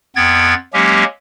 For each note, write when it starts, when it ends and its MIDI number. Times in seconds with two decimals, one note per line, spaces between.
0.16 0.54 41
0.16 0.54 59
0.16 0.54 79
0.16 0.54 92
0.16 0.54 93
0.74 1.04 54
0.74 1.04 56
0.74 1.04 58
0.74 1.04 61
0.74 1.04 67